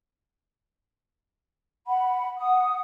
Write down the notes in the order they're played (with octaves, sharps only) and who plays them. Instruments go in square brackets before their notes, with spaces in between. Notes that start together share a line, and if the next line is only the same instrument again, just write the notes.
[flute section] F#5 B5
F#5 D#6